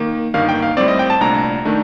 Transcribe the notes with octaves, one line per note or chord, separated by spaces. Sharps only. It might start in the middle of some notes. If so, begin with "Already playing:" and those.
Already playing: D#3 A#3
G1 G2 D#3 A#3 F5
G5
F5
A2 G3 C4 D5
D#5
G5
A5
C2 A#2 A3 D4 A#5
D#3 A3 D4